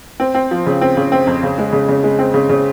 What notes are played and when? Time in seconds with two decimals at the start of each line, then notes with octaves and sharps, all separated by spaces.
0.20 C4
0.35 C4
0.51 F3
0.66 C#3
0.81 C4
0.97 C#3
1.12 C4
1.27 F2
1.43 C#3
1.58 G#3
1.72 C#3
1.88 C#3
2.03 G#3
2.19 C4
2.34 C#3
2.49 C#3